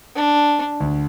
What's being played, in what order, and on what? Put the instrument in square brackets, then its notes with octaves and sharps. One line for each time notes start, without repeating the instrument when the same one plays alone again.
[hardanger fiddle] D4
[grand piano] D2 D3